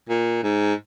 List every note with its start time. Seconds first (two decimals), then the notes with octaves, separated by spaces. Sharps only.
0.09 A#2
0.43 G#2